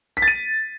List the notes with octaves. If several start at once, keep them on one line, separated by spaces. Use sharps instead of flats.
B6
A6
D#7